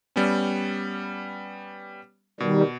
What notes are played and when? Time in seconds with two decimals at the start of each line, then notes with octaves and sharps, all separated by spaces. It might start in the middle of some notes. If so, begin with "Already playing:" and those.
0.16 G3 B3 C#4
2.40 B2 D#3 G3